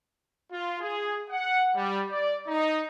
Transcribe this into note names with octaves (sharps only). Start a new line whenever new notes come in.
F4
G#4
F#5
G3
D5
D#4